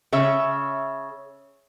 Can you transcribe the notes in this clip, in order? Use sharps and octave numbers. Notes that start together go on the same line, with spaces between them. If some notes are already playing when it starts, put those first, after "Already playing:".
C#3 C#5 E5